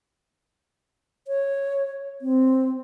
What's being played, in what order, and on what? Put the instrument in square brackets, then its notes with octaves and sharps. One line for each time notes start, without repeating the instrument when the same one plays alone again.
[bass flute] C#5
C4